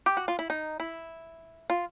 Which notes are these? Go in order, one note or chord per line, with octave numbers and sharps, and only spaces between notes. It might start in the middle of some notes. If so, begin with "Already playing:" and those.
G4
F#4
F4
E4
D#4
E4
F4